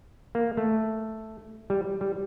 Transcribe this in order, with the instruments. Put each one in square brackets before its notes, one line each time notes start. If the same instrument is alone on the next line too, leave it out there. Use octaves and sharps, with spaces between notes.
[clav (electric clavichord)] A#3
A3
G3
G3